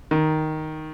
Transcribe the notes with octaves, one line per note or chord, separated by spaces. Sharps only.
D#3